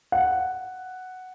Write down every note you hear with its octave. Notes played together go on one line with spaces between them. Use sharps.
F#5